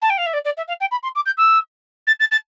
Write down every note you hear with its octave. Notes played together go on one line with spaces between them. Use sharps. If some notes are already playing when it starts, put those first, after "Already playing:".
A5
G5
F5
E5
D5
D5
E5
F5
G5
B5
C6
D6
G6
E6
A6
A6
A6